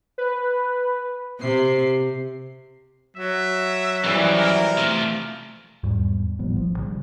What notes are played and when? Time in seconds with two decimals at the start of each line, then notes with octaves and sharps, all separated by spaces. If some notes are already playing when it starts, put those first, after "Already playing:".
0.18 B4
1.41 C3 C7
3.17 F#3 E5
4.04 F#2 E3 F3 G3
4.36 A#4
4.78 C3 F3 A3
5.83 E2 G#2 G3
6.39 A2 F3 G3 B3
6.53 A1 F3
6.78 C#3 G3